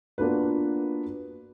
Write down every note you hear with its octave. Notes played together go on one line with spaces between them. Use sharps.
A#3 B3 D4 F4 F#4 B4